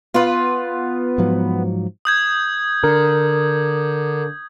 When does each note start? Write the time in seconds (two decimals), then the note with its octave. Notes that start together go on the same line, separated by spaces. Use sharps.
0.14 B3 F4 B4
1.18 G#2 F3 F#3
2.05 D#6 G6 G#6
2.84 D3 A#4